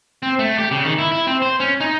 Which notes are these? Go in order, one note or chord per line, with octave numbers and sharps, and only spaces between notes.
C4
A3
G4
C#3
D#3
E4
E4
C4
C5
C#4
D#4